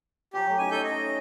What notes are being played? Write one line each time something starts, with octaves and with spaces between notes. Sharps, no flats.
F#3 G4 C5 G#5
F#3 A3
C#4 D#4 E4 G#5
D#4 A4 C#5 G6
D#5